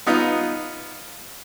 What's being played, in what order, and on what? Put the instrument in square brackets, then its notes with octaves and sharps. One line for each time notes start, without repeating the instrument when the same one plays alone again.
[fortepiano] B3 D#4 F4